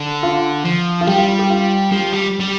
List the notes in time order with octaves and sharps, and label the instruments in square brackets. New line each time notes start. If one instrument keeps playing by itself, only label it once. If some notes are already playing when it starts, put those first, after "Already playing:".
Already playing: [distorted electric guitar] D3
[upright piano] F4
[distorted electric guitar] F3
[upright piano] F4
[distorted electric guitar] G3 [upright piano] G4
[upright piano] F4
G4
F4
[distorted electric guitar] F3 [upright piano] G4
[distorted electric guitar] G3
G3